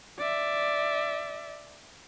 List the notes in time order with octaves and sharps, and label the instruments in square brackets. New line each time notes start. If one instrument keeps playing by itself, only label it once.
[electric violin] D5 E5